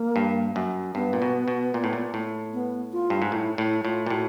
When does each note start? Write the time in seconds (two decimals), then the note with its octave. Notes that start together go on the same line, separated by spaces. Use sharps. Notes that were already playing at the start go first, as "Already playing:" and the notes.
Already playing: A#3
0.16 G2
0.56 F#2
0.95 G2 B3
1.13 A#2
1.22 B2
1.48 B2
1.74 A#2
1.84 A2
1.93 A#2
2.14 A2
2.54 B3
2.93 F4
3.10 G2
3.22 G#2
3.32 A2 E4
3.58 A2 E4
3.85 A2 F4
4.06 A#2
4.10 A2 F#4